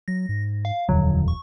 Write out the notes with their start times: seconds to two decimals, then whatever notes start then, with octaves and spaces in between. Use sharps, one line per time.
0.08 F#3 A#6
0.29 G#2
0.65 F5
0.89 D#1 F2 D3 F#3
1.28 C#6